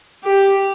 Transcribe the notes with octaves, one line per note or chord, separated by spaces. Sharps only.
G4